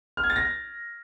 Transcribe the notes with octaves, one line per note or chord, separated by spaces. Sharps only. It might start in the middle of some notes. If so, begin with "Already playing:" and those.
F6
G#6
A6
A#6